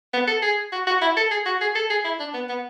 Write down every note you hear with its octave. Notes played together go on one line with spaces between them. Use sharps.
B3
A4
G#4
F#4
F#4
E4
A4
G#4
F#4
G#4
A4
G#4
E4
D4
B3
B3